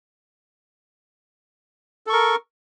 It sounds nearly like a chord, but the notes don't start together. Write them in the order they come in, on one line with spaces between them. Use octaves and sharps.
A4 C#6 A#4